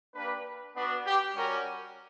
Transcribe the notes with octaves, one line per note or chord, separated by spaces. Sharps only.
A#3 D4 G4 B4
B3 D4 F#4 B4
G4
G3 C#4 F#4 A#4